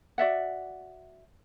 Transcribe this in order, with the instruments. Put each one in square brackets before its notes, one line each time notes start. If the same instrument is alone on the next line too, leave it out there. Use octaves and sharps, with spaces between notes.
[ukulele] F#4 D5 E5 F#5